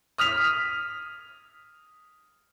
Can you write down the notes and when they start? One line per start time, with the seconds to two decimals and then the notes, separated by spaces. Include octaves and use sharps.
0.18 D#6 F6 B6 F7